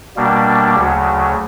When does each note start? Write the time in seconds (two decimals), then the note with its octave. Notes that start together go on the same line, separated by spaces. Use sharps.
0.16 B2 G3 A#3 D4
0.76 D2 C#3 F#3